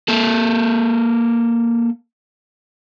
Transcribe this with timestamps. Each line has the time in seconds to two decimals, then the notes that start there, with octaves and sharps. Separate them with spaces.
0.08 A#3 A4